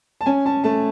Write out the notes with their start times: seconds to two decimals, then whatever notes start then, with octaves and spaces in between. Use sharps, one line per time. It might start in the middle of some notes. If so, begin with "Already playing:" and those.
0.21 A5
0.26 C#4 G#5
0.46 C#4 A5
0.64 A3 A5